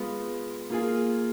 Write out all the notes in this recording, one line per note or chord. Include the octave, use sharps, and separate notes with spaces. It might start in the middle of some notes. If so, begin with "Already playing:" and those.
Already playing: G#3 B3 F4
A#3 F4 G#4